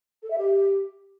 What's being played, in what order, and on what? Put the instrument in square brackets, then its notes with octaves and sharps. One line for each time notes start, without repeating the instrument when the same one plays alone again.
[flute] A4
E5
G4